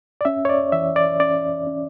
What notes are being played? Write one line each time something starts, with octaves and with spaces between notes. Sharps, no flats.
D5
C#4 E5
C#5
D5
E3 E5
D5
C#4 D5
C#4